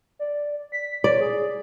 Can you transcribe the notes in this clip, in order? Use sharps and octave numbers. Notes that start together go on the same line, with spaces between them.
D5
B6
C#5 D5
G#4